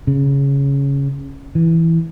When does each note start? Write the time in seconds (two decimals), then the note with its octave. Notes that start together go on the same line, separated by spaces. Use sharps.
0.07 C#3
1.55 E3